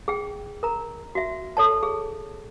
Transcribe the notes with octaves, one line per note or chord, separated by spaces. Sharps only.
G#4 G5
A#4 A#5
F#4 E5
A4 C#5 A5
G#4